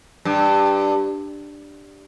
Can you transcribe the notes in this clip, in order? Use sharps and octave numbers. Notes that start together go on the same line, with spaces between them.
G2